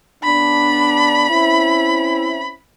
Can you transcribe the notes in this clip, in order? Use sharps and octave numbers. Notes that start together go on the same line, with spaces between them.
C#3 B3 D4 B5
C4 C#4 E4